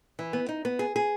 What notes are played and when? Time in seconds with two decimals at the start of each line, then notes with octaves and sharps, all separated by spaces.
0.19 E3
0.33 B3
0.49 D#4
0.65 B3
0.79 G#4
0.96 G#4